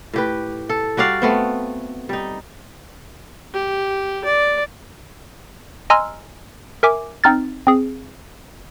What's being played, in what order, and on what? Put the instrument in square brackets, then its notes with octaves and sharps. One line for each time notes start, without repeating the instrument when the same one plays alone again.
[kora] A2 G4 B4
A4
G3 F#4 D5 F5
A3 B3 C4
G3 D#4
[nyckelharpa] G4
D5
[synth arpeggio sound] D#5 G#5 A#5 C6 E6 F6
A#4 E5 G#5 D6
C4 D#4 F6 A6
C4 G#4